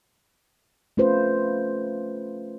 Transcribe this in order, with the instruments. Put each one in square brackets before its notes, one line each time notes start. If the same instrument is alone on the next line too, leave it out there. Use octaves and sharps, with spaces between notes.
[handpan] A3 C#4 F4 B4 C5